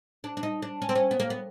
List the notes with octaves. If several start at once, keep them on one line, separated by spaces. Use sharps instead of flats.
D4
D4
D#4
D4
C#4
C4
C#4
B3
A#3
B3